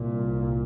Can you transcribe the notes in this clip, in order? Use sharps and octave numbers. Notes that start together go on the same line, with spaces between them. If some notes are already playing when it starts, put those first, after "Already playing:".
Already playing: C2 A#2